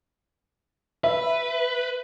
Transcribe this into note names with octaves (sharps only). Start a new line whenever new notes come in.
B4 E5